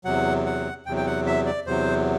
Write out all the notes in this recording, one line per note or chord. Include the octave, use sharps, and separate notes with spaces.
E2 C3 F#3 F#5
F#5
E2 C3 F#3 G5
G5
F#5
E5
D5
E2 C3 F#3 C5